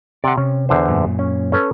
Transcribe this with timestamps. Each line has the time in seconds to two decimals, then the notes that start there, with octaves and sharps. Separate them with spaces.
0.24 C3 D5 F#5
0.37 C3 C#4
0.69 E2 D3 C5
0.88 F#2 A#2
1.19 C#4
1.52 C#4 A4 B4